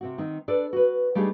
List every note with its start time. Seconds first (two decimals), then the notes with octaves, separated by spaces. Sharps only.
0.01 C3 C4 F#4
0.18 D#3 C4 D#4
0.48 D4 A4 B4 D5
0.73 F#4 B4
1.15 G3 A3 D4 D#4 G4 G#4